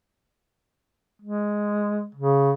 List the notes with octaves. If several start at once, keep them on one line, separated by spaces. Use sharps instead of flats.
G#3
C#3